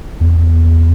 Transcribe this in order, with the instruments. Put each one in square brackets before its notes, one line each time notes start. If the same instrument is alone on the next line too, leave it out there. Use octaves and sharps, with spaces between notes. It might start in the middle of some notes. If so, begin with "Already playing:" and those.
[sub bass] E2